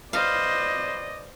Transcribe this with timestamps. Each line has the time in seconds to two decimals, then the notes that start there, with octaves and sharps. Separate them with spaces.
0.13 B4 C5 D5 D#5 F5